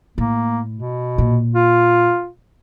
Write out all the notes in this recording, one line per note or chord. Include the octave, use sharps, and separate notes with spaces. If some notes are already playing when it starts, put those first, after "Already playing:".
A2 A#3
B2
A#2
F4